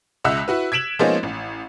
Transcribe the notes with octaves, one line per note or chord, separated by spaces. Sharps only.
C#2 D#5 E5 F#5 E6 F#6
E4 F#4 B4
G#6 B6 D7 E7 F#7
F3 G#3 A#3 B3 C#4 D#4
A1